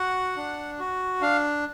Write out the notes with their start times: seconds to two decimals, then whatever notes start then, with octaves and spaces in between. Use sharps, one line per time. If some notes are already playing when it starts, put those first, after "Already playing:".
Already playing: F#4 F#5
0.36 D4
0.79 F#4
1.22 D4 F5